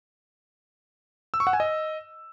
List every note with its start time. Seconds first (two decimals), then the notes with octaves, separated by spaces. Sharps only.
1.34 E6
1.40 C#6
1.47 F#5
1.53 G#5
1.60 D#5